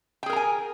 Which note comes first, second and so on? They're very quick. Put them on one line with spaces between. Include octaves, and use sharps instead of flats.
G5 G#4 A#4 A#5 G#5